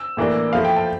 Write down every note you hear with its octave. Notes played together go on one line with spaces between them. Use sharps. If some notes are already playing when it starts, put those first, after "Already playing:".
Already playing: E6
A2 E3 A#3 D4
F3 A3 E4 F5
G5
A5